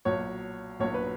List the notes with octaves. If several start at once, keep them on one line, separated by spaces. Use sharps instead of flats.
B1 A#2 F#3 C#5
B1 A#2 F#3 C#5
B4